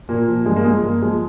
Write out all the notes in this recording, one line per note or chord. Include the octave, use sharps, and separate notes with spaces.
A#2 A#3
F3
G2 G#3
A#3
F3 G#3
G2 A#3
F3 G#3